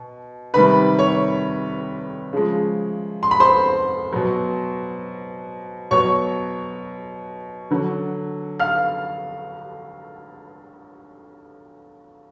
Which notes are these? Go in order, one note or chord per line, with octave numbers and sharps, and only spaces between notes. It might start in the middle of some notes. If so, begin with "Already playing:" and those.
Already playing: B2
C3 D#3 G3 B4 B5
C#5 C#6
C#3 F3 G#3
C6
B5
C5 C6
B2 F#3
B2 F#3 C#5 C#6
D3 F#3
F5 F6